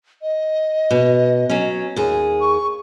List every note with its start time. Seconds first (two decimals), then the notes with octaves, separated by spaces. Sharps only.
0.22 D#5
0.91 B2
1.50 F#3 C#4
1.96 D#2 G#4
2.41 C#6